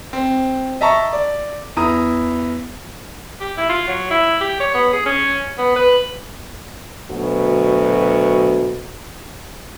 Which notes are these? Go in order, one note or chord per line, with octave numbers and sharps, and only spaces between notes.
C4
D#5 E5 A5 A#5 C#6
D5
E2 E4 A#5 D#6
G4
E4
F4
F#3
E4
G4
C#5
B3
G#4
C#4
B3
B4
D2 B2 F#3 F#4